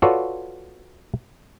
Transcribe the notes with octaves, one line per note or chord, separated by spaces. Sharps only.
F4 F#4 A4 B4 C#5 D5